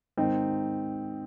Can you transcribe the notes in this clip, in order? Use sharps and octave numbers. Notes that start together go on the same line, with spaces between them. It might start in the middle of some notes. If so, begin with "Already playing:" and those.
G#2 D#3 C4 D#4